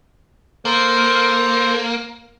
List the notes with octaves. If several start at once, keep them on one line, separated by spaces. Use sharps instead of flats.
A#3 A4 C5